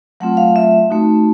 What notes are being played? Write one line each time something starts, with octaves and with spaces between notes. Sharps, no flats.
F#3 A3 C4 F4 F#5
F5
E5
A3 C4 D#4 F#4